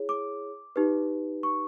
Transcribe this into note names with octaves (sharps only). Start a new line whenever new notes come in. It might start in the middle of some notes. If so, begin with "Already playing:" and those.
Already playing: E4 G#4 C#5
D6
D#4 G4 B4
C#6